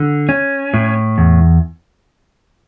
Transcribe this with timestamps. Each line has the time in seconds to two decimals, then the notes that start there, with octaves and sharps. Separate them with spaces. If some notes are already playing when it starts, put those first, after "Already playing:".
Already playing: D3
0.29 C#4
0.74 A2
1.18 E2